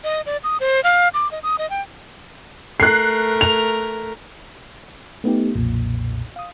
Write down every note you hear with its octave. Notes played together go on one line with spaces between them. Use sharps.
D#5
D5
D#6
C5
F5
D6
D#5
D#6
D#5
G5
A3 A#4 F#6 C7
F7
A3 B3 D#4 G4
B1 F2 A#2
F5 D#6